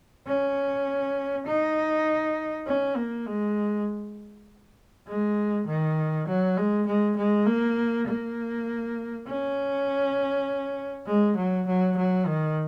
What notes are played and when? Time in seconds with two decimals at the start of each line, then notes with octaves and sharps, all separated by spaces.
0.27 C#4
1.46 D#4
2.67 C#4
2.96 A#3
3.26 G#3
5.07 G#3
5.67 D#3
6.27 F#3
6.57 G#3
6.86 G#3
7.17 G#3
7.46 A#3
8.07 A#3
9.27 C#4
11.07 G#3
11.37 F#3
11.67 F#3
11.97 F#3
12.26 D#3